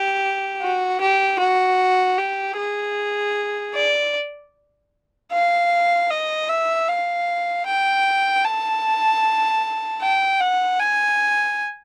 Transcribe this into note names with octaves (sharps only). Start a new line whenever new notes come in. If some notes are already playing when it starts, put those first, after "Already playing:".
Already playing: G4
F#4
G4
F#4
G4
G#4
D5
F5
D#5
E5
F5
G5
A5
G5
F#5
G#5